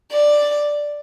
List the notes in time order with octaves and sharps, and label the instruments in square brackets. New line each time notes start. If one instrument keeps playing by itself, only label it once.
[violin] D5